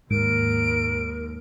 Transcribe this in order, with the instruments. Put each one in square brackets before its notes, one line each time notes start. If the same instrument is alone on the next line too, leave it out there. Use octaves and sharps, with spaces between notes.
[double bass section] D#2 [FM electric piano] G#2 [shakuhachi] A#4 [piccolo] D7